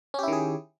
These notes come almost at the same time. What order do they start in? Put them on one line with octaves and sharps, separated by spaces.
C#4 G4 E4 D#3 G#4